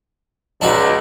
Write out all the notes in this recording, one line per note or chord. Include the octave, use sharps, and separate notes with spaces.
C#2 D4 D#4 F#4